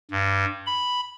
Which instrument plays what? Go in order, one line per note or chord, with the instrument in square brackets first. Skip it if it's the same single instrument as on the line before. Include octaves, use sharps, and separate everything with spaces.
[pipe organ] G2
B5